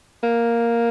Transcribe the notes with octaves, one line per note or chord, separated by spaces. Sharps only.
A#3